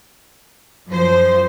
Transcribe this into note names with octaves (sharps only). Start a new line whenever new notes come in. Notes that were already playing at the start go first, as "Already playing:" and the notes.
F#2 F3 C5